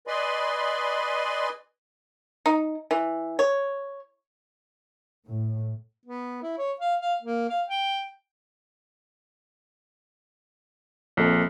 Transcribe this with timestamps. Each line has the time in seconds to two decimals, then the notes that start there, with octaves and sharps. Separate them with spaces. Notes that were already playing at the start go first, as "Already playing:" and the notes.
0.07 B4 D5 D#5 G#5 B5 C6
2.46 D#4
2.91 E3
3.39 C#5
5.27 A2
6.05 B3
6.43 E4
6.58 C#5
6.80 F5
7.01 F5
7.22 A#3
7.49 F5
7.68 G5
11.17 A#1 C4 A4 D#5